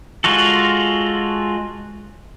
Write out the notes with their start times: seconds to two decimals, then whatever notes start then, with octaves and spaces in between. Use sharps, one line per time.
0.24 G#3 F4 F#4 A4